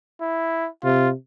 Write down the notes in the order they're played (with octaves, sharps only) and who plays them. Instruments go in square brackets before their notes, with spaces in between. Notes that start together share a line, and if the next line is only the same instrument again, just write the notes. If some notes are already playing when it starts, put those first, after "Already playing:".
[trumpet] E4
[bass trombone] C3 [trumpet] F4